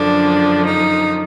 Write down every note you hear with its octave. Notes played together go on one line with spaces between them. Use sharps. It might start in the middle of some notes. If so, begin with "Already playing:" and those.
Already playing: F#2 D3 F3 D4
D#4